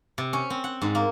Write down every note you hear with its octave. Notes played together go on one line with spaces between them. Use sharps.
C3
C#4
C4
F#5
G#2
A#3